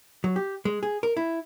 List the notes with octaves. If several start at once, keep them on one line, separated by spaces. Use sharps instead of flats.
F#3
G4
G#3
G#4
A#4
E4